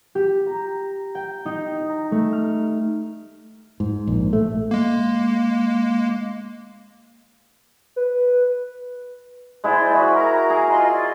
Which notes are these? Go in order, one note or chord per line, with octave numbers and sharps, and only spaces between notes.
G4
A#5
G5
D#4
A#5
A3
F6
G#2
A#1
A3
G#3 A#3
B4
G#3 E4 C5 D5 F#5
F#4 G#4 E5 B5
A#4 A#5
G#4
F4 D#5 C6
D5